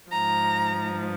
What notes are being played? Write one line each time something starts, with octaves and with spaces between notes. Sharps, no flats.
G#2 F3 A#5